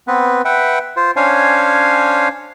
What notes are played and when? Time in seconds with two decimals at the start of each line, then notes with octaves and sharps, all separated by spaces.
0.08 B3 C4 B4
0.45 B4 E5 F#5 G5
0.97 F4 C5
1.16 C#4 D4 C5 C#5 F5 G#5